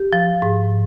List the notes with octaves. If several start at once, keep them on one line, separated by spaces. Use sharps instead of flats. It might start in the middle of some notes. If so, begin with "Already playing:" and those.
Already playing: G4
F3
G#2